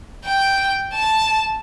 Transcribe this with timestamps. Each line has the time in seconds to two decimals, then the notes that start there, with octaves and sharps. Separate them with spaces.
0.25 G5
0.94 A5